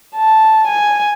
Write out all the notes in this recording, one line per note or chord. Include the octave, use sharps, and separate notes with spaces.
A5
G#5